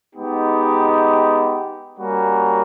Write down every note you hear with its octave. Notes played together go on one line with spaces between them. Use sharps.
G#3 B3 D#4 G4
G3 A#3 C#4 F#4